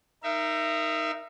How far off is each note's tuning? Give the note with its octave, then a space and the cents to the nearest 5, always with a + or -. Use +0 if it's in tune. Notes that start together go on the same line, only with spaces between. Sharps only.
D#4 +0 A#4 +0 E5 +30